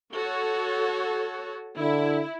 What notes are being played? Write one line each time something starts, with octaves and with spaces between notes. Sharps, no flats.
F#4 A4 C#5
D3 E4